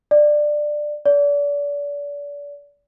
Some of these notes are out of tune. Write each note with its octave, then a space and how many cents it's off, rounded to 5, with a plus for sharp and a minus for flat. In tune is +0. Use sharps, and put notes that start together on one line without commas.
D5 +15
D5 -35